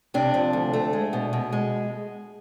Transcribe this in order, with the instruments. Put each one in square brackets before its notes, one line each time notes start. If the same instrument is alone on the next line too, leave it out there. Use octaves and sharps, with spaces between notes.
[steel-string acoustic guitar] C3 D4
F3
D2
A3
G#3
B2
B2
G#3